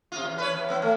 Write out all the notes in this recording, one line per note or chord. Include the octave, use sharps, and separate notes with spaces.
C3 F4
E2
B4 C#5
E2
B3
A3